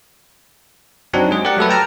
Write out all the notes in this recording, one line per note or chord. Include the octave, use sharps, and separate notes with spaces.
F#3 C4 D4 D#4 F#4
G#3 G#4
G4 A#4 D5 F#5
F#3 A3 A4 B4
G5 A5 A#5 F6